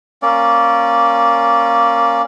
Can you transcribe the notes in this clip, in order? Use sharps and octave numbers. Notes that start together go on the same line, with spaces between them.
A#3 C#4 D5